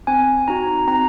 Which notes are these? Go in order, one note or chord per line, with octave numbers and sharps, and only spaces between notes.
C4 G#5
D#4 F#4 A#5
C4 A#5